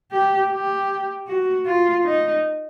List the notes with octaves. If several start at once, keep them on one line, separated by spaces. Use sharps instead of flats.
G4
G4
F#4
F4
D#4